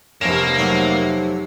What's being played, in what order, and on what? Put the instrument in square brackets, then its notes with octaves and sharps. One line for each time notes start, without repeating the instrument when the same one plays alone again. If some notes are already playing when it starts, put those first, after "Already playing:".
[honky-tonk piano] F1 E7 [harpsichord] F3 C#4 [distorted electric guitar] A#3
[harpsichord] C3 F#3 A3 [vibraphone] D#4 C5